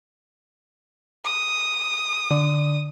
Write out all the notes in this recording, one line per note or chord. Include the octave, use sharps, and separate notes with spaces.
D#6
D3